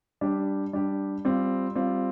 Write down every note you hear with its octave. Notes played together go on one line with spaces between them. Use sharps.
G3 D4 G4
G3 D4 G4
G3 C4 F4
G3 C4 F4